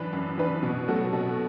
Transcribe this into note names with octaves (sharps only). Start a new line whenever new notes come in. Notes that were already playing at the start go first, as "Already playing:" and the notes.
Already playing: F#2 E3 D4 B4
F#2
E3 D4 B4
B2
F#3 A3 F#4 A4
B2